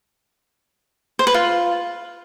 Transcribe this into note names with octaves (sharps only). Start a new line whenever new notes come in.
C5
B4
F4